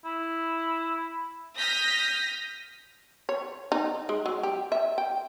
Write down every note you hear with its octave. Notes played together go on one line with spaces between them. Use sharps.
E4
D#6 F6 G6 A#6 B6
C#5
D#4
G#3
F#3
G4
E5
G5